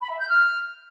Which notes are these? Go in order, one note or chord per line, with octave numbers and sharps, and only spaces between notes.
B5
E5
G6
F6